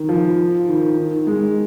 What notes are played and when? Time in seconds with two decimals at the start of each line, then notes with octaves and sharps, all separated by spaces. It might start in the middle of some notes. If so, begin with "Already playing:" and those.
Already playing: D#3
0.09 F3
0.68 D#3
0.97 D#3
1.27 G#3